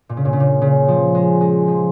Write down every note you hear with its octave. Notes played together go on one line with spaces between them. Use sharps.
A#2
C#3
A#2
C#3
A#2
C#3
F3
G#3
G#3
F3